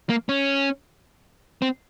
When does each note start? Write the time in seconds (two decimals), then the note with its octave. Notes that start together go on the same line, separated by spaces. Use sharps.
0.09 A#3
0.29 C#4
1.62 C4